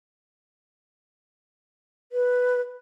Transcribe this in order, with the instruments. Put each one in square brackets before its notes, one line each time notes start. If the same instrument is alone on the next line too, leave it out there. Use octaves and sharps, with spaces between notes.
[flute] B4